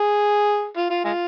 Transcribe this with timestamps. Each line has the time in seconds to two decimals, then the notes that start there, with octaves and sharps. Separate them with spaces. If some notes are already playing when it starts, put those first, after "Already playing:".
Already playing: G#4
0.76 F4
0.90 F4
1.05 G#3 F4